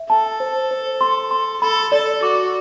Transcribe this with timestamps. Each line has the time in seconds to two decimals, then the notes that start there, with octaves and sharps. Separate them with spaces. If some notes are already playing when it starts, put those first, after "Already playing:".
Already playing: E5
0.10 A4 A5
0.40 C5
0.71 C5
1.01 C6
1.31 C6
1.62 A4 B5
1.92 A4 D5
2.23 F#4 D6